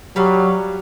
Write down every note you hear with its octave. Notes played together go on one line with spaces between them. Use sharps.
F#3 G3 F5